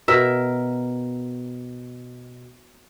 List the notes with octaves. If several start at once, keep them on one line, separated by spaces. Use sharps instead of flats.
B2 A#4 E5